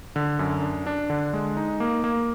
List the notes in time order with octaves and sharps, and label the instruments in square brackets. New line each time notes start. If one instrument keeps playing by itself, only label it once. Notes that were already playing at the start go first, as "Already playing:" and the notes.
[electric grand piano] D3
F#2
D4
D4
D3
G#3
D#4
A#3
A#3